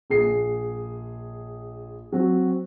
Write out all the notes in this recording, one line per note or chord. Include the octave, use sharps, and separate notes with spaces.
A#1 G#4 C7
F#3 C4 F#4